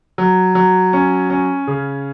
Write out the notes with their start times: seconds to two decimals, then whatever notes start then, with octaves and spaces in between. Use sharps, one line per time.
0.18 F#3
0.55 F#3
0.93 C#4
1.30 C#4
1.67 C#3